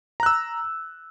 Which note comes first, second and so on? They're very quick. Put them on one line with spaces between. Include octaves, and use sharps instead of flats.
A#5 F#6 E6